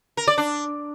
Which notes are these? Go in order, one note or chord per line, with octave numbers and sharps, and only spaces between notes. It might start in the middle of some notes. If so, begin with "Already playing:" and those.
A#4
D5
D4